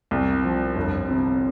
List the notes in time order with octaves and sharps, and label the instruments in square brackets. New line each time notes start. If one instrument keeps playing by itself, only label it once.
[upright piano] C2
F3
G1
C3